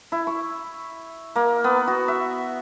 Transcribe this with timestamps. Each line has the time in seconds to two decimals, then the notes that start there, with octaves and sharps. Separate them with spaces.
0.12 E4
0.27 C#6
1.36 A#3
1.64 B3
1.87 F#4
2.08 E5